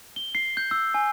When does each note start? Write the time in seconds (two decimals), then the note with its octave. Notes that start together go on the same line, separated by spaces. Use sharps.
0.16 G7
0.35 C7
0.57 G6
0.71 E6
0.94 G#5